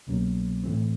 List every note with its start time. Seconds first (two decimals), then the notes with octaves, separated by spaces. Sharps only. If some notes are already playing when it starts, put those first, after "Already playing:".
0.07 C2 B2 F#3 A#3 C#4
0.64 A2 E3 A3 C4